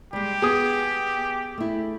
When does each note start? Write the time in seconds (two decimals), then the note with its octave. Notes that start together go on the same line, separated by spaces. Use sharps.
0.13 G3 G#3 G4
0.42 B3 G#4 D#6
1.58 A3 E4